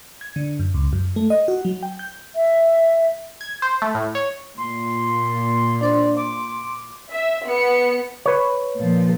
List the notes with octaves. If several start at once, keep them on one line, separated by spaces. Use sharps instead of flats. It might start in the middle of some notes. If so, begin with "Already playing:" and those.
G#6
D3
F#2
C#2
F#2
A3
D#5
F#4
F#3
G5
G6
E5
G#6
C5
A3
A2
C#5
A#2 C6
D4 C5 D5 C6
C6 D6
E5
B3 C#7
B4 C#5
A#2 F3